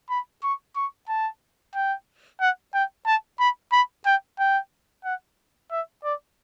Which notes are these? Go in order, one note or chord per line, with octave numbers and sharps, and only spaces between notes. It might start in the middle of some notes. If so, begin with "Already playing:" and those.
B5
C#6
C#6
A5
G5
F#5
G5
A5
B5
B5
G5
G5
F#5
E5
D5